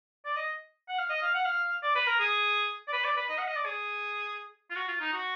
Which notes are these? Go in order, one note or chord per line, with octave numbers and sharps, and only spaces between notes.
D5
D#5
F#5
F5
D#5
F5
F#5
F5
D5
B4
A#4
G#4
D5
B4
D5
B4
D#5
F#5
D#5
D5
G#4
F4
F#4
F4
D#4
F#4